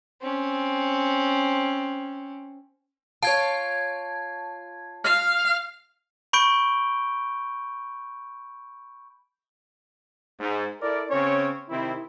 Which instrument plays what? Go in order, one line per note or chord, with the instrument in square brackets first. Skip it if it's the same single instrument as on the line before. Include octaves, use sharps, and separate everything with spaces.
[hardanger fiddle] C4 C#4
[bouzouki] F4 C#5 [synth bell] A5 G#6
[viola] F5 [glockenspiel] F6
[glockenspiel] B5 C#6 G6 D7 G7
[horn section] G#2
E4 A4 A#4 D5
C#3 C4 C#4 C#5
C3 D#3 C4 E4